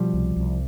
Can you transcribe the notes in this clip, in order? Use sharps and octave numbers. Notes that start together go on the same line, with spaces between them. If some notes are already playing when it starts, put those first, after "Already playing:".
Already playing: B2 F3 G3
C2
C2